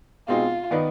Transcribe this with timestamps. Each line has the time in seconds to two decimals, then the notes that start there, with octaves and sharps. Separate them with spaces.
0.28 B2 G#3 C4 D#4 F4 G#4
0.71 D#3 B3 D#4 B4 D5